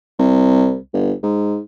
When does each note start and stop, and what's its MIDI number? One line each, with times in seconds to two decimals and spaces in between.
0.19 0.77 36
0.94 1.12 31
1.23 1.59 44